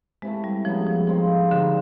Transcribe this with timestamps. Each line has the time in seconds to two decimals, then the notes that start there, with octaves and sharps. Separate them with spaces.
0.22 C3 E3 G#3 A3
0.44 G3
0.65 C#3 F3 F#3 B3
0.87 F3
1.08 D#3 F3 G#3 C4 F4
1.51 G#2 D3 D#3 G3